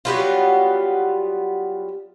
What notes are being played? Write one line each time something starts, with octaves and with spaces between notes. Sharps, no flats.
F#3 G3 B3 F4